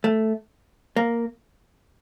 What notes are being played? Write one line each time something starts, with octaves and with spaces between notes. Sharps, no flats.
A3
A#3